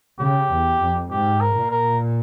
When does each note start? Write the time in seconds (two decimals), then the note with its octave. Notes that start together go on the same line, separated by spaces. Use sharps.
0.20 C#3 G4
0.51 E2
0.81 F2
1.10 G#2 G4
1.40 A#4
1.56 A#2
1.71 A#4